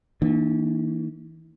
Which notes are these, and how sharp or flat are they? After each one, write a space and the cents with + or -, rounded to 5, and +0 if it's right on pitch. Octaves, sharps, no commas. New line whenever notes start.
E3 -35 A#3 +0 D4 +30